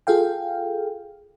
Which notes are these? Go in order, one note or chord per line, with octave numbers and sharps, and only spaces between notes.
F4 G#4 A4 F5 G5